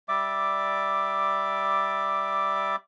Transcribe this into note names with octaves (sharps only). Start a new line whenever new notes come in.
G3 D5 E5 D6